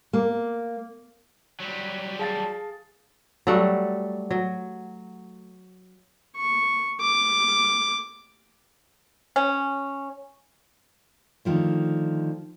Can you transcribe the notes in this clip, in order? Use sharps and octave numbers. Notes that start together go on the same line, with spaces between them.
A#3
F#3 G3
G#4 F5 A5 A6
F#3 G3 A3 F#5
F#3
C#6
D6
C#4
D3 D#3 F3 A3